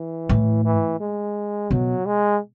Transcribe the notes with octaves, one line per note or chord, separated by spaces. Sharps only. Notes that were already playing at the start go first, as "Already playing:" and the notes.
Already playing: E3
A2
E3
G#3
B2 F#3
G#3